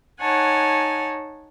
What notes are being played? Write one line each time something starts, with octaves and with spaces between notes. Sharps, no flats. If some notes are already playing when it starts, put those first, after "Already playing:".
D#4 C#5 F#5 G#5 A5